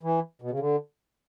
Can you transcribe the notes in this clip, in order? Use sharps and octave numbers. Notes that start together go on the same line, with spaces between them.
E3
B2
C#3
D3